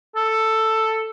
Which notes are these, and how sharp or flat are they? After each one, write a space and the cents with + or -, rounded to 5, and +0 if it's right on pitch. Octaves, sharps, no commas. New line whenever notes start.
A4 +5